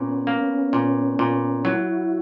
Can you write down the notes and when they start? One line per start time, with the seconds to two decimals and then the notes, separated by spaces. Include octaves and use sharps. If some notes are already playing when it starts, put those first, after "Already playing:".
Already playing: A#2 B3 C#4
0.27 A#3
0.73 A#2
1.19 A#2
1.64 F#3 E4 F#4